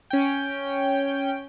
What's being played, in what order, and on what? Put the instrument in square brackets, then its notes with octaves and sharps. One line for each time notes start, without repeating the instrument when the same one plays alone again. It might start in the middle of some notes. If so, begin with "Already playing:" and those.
[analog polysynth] C#4 G5